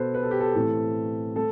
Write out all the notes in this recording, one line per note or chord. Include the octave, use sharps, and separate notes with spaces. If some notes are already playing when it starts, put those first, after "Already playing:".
Already playing: B2 B3 A4 B4 C5
B4
A4
G4
A4
A2 E3 A3 C4
A3 C4 A4